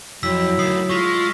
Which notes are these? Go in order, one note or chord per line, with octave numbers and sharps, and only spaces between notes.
F2 F#3 E4 E6 B6
D2 D#3 D#6 C7
G#3 F4 C#6 B6